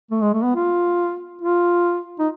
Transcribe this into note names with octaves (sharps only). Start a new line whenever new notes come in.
A3
G#3
A3
B3
F4
F4
D#4